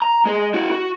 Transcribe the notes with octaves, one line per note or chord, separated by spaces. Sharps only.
A#5
G#3 G#4
E4 F#4
F#4